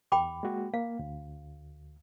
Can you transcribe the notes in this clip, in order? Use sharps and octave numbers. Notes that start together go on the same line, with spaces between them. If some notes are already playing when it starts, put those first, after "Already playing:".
E2 G5 B5 D6
G#3 A#3 F#4
A#3 F5
D2